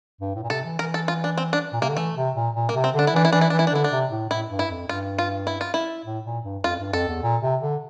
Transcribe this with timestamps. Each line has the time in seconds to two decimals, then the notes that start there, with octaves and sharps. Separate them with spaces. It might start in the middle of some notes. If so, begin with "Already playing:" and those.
0.21 G2
0.36 A2
0.43 A#2
0.50 C3 A4
0.65 E3
0.79 E3 A#4
0.94 A4
1.08 F4
1.24 D4
1.38 C4
1.53 D4
1.73 A#2
1.81 C3 A#3
1.89 D3
1.97 E3 A3
2.16 C3
2.36 A#2
2.55 A#2
2.69 A#3
2.74 C3
2.84 C4
2.94 D3
2.99 D4
3.07 E4
3.13 E3 D4
3.25 E4
3.32 E3 D4
3.41 E4
3.50 E3 D4
3.59 E4
3.67 D4
3.71 D3 E4
3.84 D4
3.91 C3
4.11 A2
4.30 A2 E4
4.50 G2
4.59 E4
4.70 F2
4.88 G2 F4
5.18 F4
5.47 E4
5.61 F4
5.74 E4
6.06 A2
6.25 A#2
6.44 G2
6.64 F2 F4
6.79 G2
6.93 F2 A4
7.09 E2
7.23 A#2
7.42 C3
7.62 D3